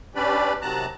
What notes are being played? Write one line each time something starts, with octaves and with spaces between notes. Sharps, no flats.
C#4 D4 G4 B4 D5 B5
C3 D#3 F#3 A5 A#5 F#6